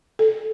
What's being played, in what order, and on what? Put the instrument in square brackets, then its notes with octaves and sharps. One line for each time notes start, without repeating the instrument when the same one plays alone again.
[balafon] A4